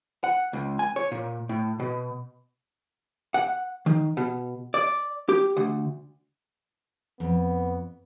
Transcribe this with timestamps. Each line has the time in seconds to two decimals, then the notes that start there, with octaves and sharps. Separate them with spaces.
0.24 F#5
0.53 C#2
0.79 G#5
0.96 C#5
1.12 A#2
1.49 A2
1.80 B2
3.34 F#5
3.86 D#3
4.17 B2
4.74 D5
5.29 G4
5.57 D2
7.20 F2 B3